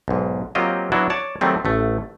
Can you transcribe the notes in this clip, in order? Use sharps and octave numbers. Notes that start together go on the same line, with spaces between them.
B1 G#2
F#3 A#3 C4 F4 G4 D#5
F#3 B3 D4 E4 F#4
C#5 D5 A5
D#3 F#3 G3 A3 C4
A1 A3